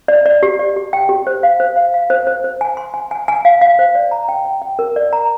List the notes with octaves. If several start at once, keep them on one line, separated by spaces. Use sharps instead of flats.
D5
D5
G4
D5
G4
G5
G4
C5
F5
C5
F5
F5
C5
C5
C5
G#5
C6
G#5
G#5
G#5
F5
F5
C5
D5
A#5
G5
G5
G5
A#4
D5
A#5